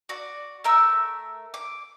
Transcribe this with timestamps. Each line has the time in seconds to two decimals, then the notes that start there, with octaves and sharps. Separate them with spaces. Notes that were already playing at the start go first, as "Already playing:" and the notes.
0.09 F#4 D5
0.64 A3 A#4 E5 E6
1.54 D6